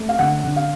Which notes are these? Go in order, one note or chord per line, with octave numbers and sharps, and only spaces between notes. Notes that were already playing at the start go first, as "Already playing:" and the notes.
Already playing: A3
F5
D3 F#5
D3
F5